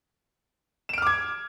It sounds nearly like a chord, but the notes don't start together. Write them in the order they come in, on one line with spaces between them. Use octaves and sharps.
E7 D7 F6 D6 G#6